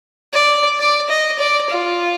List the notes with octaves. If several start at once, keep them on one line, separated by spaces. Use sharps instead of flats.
D5
D5
D#5
D5
F4